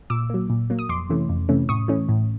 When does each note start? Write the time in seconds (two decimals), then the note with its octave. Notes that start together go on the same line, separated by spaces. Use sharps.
0.10 A#2 D6 E6
0.30 F#3 A#3
0.50 A#2
0.70 F#3 A#3
0.79 D#6
0.89 F2 C6 D6
1.09 C3 E3 A3 C#4
1.29 F2
1.49 C3 E3 A3 C#4
1.69 A2 C#6 D#6
1.88 E3 A3 C#4
2.09 A2